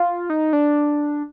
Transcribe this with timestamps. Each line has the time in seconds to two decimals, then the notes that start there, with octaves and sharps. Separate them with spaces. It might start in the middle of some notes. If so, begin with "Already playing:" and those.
Already playing: F4
0.30 D#4
0.53 D4